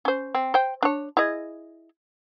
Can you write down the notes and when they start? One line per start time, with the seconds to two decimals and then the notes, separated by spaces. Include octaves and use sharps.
0.05 C#4 C5
0.35 C4
0.54 C5 G5
0.83 D4 C#5
1.17 E4 G#4 D#5